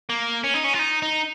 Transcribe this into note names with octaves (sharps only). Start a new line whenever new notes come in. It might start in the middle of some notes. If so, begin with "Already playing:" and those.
A#3
C#4
D#4
C#4
F4
D#4
D#4